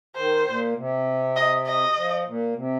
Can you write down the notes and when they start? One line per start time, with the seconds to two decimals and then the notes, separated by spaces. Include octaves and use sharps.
0.16 D#3 C5
0.47 A#2
0.76 C3
1.36 D#5
1.67 D#5
1.97 F3
2.27 A#2
2.56 C3